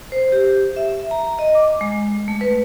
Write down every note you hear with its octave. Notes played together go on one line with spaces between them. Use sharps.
C5
G4
E5
A#5
D#5
D6
G#3
A3
B4